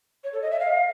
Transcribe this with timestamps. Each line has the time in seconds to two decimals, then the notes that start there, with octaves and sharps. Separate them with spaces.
0.24 C#5
0.33 A4
0.42 D#5
0.51 E5
0.60 F5